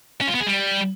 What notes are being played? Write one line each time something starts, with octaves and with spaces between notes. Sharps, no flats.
C#4
F4
B3
G#4
G3